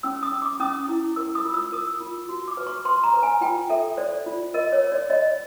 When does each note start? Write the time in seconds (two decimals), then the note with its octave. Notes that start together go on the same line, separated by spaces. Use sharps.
0.03 C#4 E6
0.23 D#6
0.32 C#4
0.42 D6
0.60 C#4 D#6
0.89 E4
1.16 A#4 E6
1.35 D#6
1.45 F4
1.54 E6
1.72 A#4 D#6
2.00 F4
2.29 F#4
2.48 D6
2.57 B4
2.67 C#6
2.85 B4 C6
3.03 A#5
3.14 B4
3.23 G#5
3.41 F4 G5
3.70 A4 E5
3.97 C5 D5
4.26 F4
4.54 A#4 D#5
4.72 C#5
4.83 C#5
4.92 D5
5.10 C#5 D#5